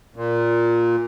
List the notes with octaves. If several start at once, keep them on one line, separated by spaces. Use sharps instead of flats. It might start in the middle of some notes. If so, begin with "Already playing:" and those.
A#2